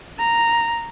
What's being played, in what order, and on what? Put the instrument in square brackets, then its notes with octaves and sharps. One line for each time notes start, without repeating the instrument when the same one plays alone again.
[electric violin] A#5